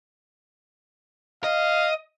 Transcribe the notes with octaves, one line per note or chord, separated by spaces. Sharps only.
D#5 F5